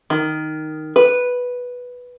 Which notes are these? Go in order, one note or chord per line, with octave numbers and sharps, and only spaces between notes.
D#3
B4